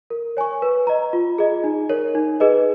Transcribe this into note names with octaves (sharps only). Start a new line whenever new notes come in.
A#4
C#5 G#5 C#6
B4
D#5 A#5
F4
G#4 D#5
D#4
A#4 C#5
D#4
G#4 B4 D#5